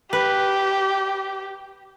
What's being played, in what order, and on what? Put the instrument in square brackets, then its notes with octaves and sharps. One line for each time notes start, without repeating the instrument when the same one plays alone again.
[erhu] G4 [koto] B4